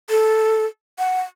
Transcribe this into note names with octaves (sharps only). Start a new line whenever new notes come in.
A4
F#5